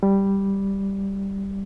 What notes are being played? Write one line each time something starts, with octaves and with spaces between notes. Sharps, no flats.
G3